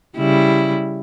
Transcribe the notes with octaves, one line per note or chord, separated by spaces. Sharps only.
C#3 G3 E4